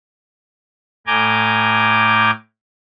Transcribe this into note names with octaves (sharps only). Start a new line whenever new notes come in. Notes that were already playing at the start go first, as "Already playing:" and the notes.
A2 G#5 A#5 D6 G6